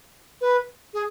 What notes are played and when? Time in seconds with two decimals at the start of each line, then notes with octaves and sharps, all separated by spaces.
0.41 B4
0.94 G#4